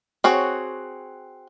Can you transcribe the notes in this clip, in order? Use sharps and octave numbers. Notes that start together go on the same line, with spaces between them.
C4 F#4 G#4 C#5